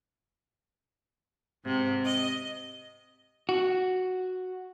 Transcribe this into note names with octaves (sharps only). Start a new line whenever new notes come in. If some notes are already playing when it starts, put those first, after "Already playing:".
G#2 C3
D#5
F#4